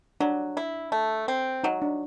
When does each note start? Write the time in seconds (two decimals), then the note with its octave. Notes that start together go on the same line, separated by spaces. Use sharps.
0.20 F#3 D4
0.57 E4
0.92 A3
1.28 C4
1.63 F#3 D#4
1.82 D4